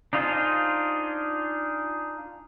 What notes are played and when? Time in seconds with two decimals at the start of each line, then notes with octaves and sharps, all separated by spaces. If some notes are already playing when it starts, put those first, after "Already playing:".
0.13 D4 D#4 F4 G#4 C5